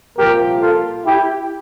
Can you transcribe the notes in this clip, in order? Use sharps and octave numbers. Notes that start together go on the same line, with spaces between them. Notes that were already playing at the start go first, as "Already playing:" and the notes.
C2 A#2 F3 A#3 G4 A#4
F4 A4
E4 G4